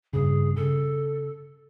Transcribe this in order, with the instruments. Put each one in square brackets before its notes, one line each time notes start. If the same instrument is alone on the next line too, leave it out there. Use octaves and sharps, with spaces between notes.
[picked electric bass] G2 C#3 [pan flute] G#4
[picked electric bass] C#3 [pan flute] A4